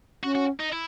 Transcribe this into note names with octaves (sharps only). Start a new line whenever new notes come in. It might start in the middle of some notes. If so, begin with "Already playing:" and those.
C#4 F#4
F#4
D#4
E4